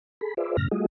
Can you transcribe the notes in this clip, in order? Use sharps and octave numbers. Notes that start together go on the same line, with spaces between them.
G#4 A4 B5
F4 G#4 B4 C5 D5 E5
F#2 A2 C#3 F6 A#6
G3 A3 F4 F#4 G#4 D#5